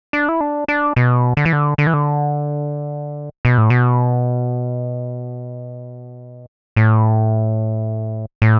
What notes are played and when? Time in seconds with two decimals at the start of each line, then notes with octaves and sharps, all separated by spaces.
0.13 D4
0.29 E4
0.41 D4
0.68 D4
0.96 B2
1.37 D3
1.45 E3
1.53 D3
1.78 D3
1.87 E3
1.94 D3
3.45 B2
3.58 A2
3.70 B2
6.76 A2
8.42 A2